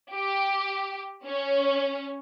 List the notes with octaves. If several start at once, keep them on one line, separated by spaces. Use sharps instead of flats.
G4
C#4